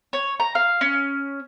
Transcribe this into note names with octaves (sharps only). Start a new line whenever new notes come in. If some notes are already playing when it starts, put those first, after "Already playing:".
C#5
A#5
F5
C#4